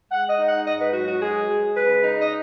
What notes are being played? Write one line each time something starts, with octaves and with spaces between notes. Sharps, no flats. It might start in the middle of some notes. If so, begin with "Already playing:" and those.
G#3 F#5
D#5
D#4
F#5
G#2 D#5
B4
F#3 F#4
F#4
G#3 G#4
G#3
C#3 B4
D#4
D#5